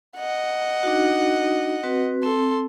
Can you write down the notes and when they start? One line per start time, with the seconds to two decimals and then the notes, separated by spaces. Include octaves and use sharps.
0.17 D#5 F#5
0.83 D4 D#4 F#4
1.83 C4 F#4 B4
2.23 C4 A4 C6